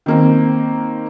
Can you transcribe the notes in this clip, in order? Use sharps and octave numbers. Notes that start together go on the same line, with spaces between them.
D#3 A#3 C4